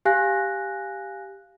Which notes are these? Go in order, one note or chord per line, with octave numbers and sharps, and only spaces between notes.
G4 F5 G#5 F#6 A#6